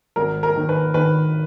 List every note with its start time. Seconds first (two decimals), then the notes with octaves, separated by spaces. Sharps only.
0.16 G#1 A#4
0.43 A#4
0.56 D#3
0.69 B4
0.94 D#3 B4